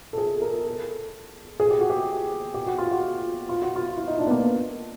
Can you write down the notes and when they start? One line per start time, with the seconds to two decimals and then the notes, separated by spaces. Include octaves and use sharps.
0.13 A4
0.18 G#4
0.42 A#4
0.65 A4
1.60 G#4
1.70 G4
1.80 F#4
1.90 G4
2.54 G4
2.66 F#4
2.78 F4
2.91 F#4
3.49 F4
3.62 F#4
3.76 F4
3.96 E4
4.08 D#4
4.19 D4
4.27 B3
4.31 A#3